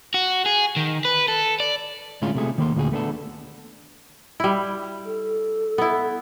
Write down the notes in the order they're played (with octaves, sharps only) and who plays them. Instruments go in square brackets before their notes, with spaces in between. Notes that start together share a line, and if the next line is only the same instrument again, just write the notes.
[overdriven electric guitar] F#4
G#4
D#3
B4
A4
D5
[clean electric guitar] A2 D3 G#3 A3 C#4 F4
C3 A3 G#4
D#3 A#3 B5 C6
D2 A#2 F#4 G#4
A3 B3 D4 A4
[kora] G3 E4
[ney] A4
[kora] B3 E4